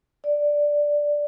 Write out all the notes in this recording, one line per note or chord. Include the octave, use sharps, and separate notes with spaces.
D5